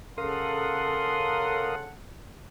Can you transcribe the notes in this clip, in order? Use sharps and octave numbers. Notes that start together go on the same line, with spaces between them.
C#3 A4 A#4 F5 F#5 C6 D#6